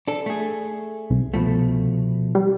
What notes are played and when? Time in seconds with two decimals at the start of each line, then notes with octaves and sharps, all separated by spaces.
0.08 D4 A4
0.26 A3 G#4
1.10 C2
1.34 B2 F3 A3
2.35 G3